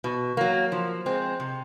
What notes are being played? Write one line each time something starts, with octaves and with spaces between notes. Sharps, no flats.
B2
F#3 A#3
F3
G#3 C4
C3